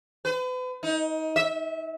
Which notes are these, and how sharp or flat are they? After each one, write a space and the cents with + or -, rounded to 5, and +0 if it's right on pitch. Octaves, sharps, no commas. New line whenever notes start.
B4 +40
D#4 +25
E5 -25